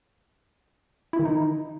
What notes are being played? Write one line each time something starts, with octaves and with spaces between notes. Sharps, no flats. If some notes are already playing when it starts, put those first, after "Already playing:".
E4
D#3
D#4